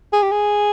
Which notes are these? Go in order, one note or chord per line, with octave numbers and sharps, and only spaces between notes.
G#4
G4
G#4